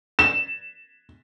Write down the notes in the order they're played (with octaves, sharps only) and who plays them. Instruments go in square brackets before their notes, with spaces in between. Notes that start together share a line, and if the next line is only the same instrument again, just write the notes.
[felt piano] E7